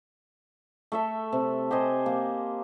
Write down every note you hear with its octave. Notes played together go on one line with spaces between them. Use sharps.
A3 A4 E5
C3
G4 C5 D#5 G#5
A#3